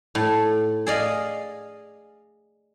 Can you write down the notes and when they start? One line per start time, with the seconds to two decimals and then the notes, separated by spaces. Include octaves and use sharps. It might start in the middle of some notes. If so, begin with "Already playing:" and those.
0.15 A2
0.86 G#4 D5 D#5 F5